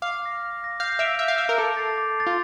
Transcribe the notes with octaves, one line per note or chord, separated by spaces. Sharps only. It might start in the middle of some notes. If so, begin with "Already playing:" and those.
F5 D6
F6 A#6
D6
F6 A#6
F5 G6
E5 D7 F7
E5 G6
F5
E5 D7 F7
A#4
A4 D6
A6 C7
D6
A6 C7
F4